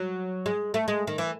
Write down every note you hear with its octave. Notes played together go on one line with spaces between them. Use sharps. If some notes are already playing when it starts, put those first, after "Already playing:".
Already playing: F#3
G#3
A3
G#3
D#3
E3